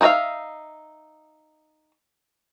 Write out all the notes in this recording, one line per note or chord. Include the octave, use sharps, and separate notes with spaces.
D#4 E4 F#4 E5 F5